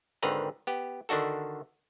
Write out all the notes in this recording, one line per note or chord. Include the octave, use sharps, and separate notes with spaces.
G#1 D3 D#3 C4 B4 A#5
B3 G4
D3 D#3 D4 F#4 A4